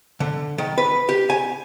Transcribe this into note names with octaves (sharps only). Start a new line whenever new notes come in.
D3
D#3
B4
G4
G#5